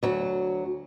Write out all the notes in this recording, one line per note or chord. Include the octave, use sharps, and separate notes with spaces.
D2 F#3